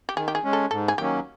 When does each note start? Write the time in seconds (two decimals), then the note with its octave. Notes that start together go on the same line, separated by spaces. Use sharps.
0.09 G4
0.17 D#3 G#4
0.28 G4
0.35 G#4
0.44 G#3 C#4
0.53 A4
0.71 G#2 A4
0.88 G#4
0.98 D#3 F#3 A#3 C#4 G4